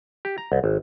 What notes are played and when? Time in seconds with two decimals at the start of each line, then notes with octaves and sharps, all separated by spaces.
0.25 G4
0.38 A#5
0.52 C2
0.64 G#1